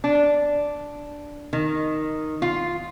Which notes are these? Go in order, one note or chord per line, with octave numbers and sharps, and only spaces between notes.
D4
D#3
F4